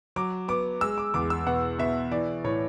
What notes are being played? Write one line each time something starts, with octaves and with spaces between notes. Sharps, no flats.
F#3 D6
B3 D6
G#3 E6
D6
E2 D6
E6
B2 F#5
B2 E5
E3 D5
A2 C#5